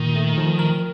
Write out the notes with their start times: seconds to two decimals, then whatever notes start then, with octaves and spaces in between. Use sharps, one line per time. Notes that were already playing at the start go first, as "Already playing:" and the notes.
Already playing: A#2 D#3
0.16 A3
0.37 F3
0.59 A#4